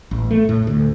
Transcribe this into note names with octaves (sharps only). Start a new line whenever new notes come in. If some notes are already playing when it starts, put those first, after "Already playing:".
A1
A3
A2
D2